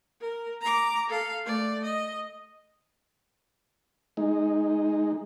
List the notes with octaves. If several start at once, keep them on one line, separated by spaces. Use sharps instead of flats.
A#4
A#5 D6
A4 F5
A3 D5
D#5
G#3 D#4